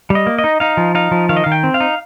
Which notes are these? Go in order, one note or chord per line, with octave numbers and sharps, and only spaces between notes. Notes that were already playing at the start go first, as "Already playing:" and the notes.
G3
D#5
A#3
D#5
D#4
D#4 F5
F3
D#4 F5
F3
D#3 F5
D#5
D#3 F5
G5
C4
F5
D#4